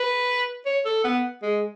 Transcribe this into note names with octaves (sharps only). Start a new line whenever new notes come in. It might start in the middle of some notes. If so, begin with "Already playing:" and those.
Already playing: B4
C#5
A4
B3
G#3